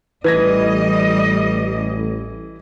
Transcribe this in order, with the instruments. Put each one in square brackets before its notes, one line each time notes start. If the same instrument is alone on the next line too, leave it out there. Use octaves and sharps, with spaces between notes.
[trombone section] A1 [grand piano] E3 G#6 A#6 [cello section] G3 D#5 [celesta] B4